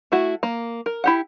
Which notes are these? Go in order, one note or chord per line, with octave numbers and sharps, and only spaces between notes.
A3 E4 F#4
A#3
A#4
E4 G4 F#5